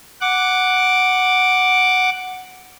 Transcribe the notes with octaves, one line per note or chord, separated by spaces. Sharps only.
F#5 D6